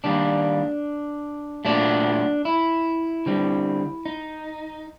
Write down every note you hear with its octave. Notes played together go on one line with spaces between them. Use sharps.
D#3 G3 A#3 D4
A#2 F#3 A3 D4
E4
D3 G3 C4
D#4